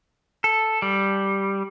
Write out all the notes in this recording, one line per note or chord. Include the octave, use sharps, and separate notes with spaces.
A4
G3